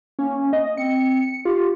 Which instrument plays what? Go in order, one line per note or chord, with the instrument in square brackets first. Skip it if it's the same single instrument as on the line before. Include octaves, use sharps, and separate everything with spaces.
[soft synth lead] A#3 [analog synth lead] C#4
[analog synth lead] D#5
[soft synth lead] C4 [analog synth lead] C#7
[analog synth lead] F4 [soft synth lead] G4